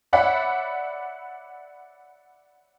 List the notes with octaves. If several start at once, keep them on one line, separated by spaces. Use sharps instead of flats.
C#5 D5 E5 F#5 B5